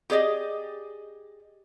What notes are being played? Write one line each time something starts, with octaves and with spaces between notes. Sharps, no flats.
G4 G#4 D5 D#5